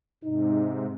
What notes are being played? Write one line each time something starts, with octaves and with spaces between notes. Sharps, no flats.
G#2 C3 D#4